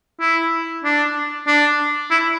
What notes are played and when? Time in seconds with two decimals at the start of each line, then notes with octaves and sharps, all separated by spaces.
0.20 E4
0.84 D4
1.47 D4
2.11 E4